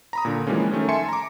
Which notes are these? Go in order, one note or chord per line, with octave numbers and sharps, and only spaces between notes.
A#5 B5 D#6
A#2 D3
E3 F3 G3 G#3 A#3 C#4
D#3 A3 C#4
E5 G#5 A5 C6 C#7
A#5 D6